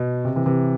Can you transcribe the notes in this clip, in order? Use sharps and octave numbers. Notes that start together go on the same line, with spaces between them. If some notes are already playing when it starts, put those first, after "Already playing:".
Already playing: B2
C3
C3 E3
C3 E3